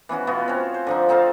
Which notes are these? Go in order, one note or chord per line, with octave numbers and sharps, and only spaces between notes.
E3 B3 C#4 F#4
B2 B3 F4 F#4
C4 C#4
C5
D3 F3 D#4
C4 D#4 A4 F5